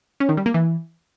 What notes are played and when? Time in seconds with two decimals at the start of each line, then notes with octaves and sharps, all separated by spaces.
0.20 C#4
0.29 D#3
0.37 G3
0.46 A#3
0.54 E3